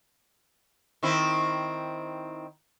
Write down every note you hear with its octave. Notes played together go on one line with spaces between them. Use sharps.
D#3 C4 E4